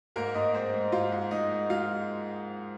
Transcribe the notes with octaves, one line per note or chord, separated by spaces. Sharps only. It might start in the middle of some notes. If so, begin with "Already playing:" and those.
G#2 A#3 A#4
G#2 D#4 D#5
G#3 C4 C5
G#3
G#2 F4 F5
G#2
G#3 D#4 D#5
G#3
G#3 F4 F5